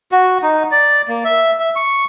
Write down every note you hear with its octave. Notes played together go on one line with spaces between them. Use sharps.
F#4
D#4
D5
A#3
E5
E5
C#6